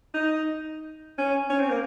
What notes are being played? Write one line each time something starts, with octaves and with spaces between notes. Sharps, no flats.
D#4
C#4
C#4
C4
A#3